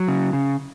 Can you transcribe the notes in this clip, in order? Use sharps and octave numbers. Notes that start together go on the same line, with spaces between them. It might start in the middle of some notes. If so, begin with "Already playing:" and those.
Already playing: F#3
C#3
C#3